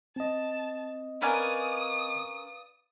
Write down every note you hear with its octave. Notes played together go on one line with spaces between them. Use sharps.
C4 D#5 A5
C#4 A#4 B4 D5 F5 G#5 D#6